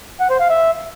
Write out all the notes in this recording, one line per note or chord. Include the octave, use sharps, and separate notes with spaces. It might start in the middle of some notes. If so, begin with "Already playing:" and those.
F#5
C5
F5
E5